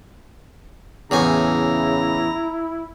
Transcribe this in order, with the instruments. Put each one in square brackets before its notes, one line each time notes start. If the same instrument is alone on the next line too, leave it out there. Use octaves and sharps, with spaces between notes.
[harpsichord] E2 A2 G#5 [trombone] C#3 [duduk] E4 [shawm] A#5